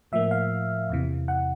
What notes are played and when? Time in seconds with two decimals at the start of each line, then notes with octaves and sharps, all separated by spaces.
0.12 A2 F3 A#3 E5
0.31 F5
0.89 E2 C3 E3
1.28 F#5